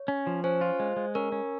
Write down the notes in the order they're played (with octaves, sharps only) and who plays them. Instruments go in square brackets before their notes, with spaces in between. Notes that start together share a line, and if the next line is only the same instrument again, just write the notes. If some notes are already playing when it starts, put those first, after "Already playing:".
Already playing: [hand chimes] C#5
[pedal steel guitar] C#4
F3
[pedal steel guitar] C#4 [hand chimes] C5
[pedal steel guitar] F4
G#3
G#3
[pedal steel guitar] C#4 [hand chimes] A#4
[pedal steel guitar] C#4